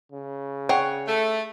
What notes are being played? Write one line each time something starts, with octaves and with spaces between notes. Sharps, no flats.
C#3
G#4 C#5 F#5 G5
A3